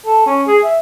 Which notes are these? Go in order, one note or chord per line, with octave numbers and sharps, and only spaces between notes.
A4
C#4
G#4
E5